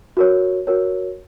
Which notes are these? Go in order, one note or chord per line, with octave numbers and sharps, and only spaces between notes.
F#4 A#4 C#5
F#4 A#4 C#5